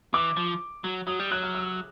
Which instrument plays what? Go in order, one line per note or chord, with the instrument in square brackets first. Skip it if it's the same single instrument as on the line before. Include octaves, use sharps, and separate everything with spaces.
[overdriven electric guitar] E3 [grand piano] D6
[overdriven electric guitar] F3
F#3
[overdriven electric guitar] F#3 [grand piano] D#6
[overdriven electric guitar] G3
[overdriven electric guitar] F#3 [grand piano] F#6
[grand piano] F6
E6